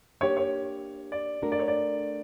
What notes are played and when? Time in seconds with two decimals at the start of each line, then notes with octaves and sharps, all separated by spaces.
0.21 A#3 D4 G4 C#5
0.37 C#5
1.12 D5
1.42 A3 D4 F#4 A#4
1.52 D5
1.59 C#5
1.68 D5